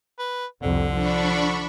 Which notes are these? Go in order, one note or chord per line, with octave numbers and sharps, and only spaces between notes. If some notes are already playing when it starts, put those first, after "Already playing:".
B4
C2 F2 D3
F3 D4 B5 C#6